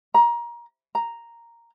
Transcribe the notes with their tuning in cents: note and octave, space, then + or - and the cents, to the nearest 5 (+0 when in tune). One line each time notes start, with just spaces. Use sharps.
A#5 +25
A#5 +0